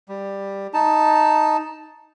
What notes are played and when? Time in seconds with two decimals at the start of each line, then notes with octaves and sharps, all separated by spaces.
0.09 G3
0.73 D#4 A5